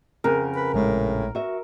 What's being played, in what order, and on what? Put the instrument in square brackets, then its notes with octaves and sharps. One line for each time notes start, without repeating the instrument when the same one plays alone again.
[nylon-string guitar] F2 C#3 F#5 [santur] A#4
[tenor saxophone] B4
[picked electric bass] A#1 G#3 [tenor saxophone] A2
[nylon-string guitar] F#4 E5